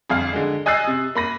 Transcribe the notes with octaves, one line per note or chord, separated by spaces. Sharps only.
G1 F2 F5
D3 G#3
D#5 G#5 E6 F#6 A6 C7
C3
A#3 B5 A#6 D#7